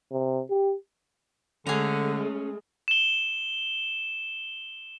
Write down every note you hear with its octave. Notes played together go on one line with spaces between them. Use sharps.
C3
G4
D3 G#3 A3 C#4 G#4 A#5
E7 G7